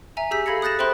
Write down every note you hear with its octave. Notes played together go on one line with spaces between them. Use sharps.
E5 G#5 A#5
G4 G#4 E6 G6 B6
A4 F5 B5 G#6 A#6 C#7
D#6 F#6 G6 A6 A#6 E7
C5 E5 G5 B5 C6 F#6